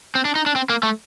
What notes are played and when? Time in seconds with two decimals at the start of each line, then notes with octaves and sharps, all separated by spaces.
0.15 C4
0.25 D4
0.35 D#4
0.46 D4
0.55 C4
0.70 A#3
0.83 A3